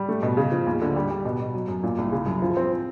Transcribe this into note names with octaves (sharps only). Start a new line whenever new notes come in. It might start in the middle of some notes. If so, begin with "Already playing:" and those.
Already playing: G3
A3
B2
C#3
F3
D#2
D3
G3
G3
B2
B2
F#3
F#2
A#2
C2
C#3
F#2
F3
C4